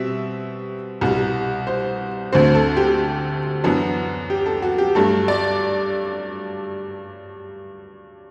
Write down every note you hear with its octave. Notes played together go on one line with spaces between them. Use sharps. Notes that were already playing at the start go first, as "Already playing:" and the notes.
Already playing: B2 G3 C4 E5
C2 B2 G3
C5
D2 D3 A3 C4 C5
A4
G4
F#2 E3 B3 D4 F#4
G4
A4
F#4
G4
G2 F#3 A3 D4 A4
D5